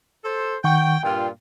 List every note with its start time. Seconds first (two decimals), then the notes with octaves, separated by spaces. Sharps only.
0.24 A4 C5
0.64 D#3 F#5 G5 C#6
1.03 G2 A#2 F4 G5